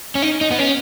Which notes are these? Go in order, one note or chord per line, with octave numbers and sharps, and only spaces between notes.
C#4
D#4
D#4
B3
C#4